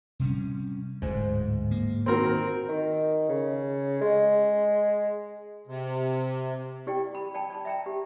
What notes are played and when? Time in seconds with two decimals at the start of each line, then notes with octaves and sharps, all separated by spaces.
0.20 C3 G3 C#4
1.02 D1 G#2
1.71 A#3
2.06 D#3 C4 F#4 A#4
2.68 D#3
3.29 C#3
4.01 G#3
5.67 C3
6.87 E4 G4 D5 G5
7.15 B5
7.34 D5 G5 A5 B5
7.50 D5 A5 B5
7.65 E5 G5 A#5
7.86 G4